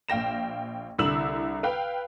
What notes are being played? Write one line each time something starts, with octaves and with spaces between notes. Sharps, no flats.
A#1 F5 G5 A#6 E7
C2 D3 E4 E6 E7 F#7
B4 F5 G5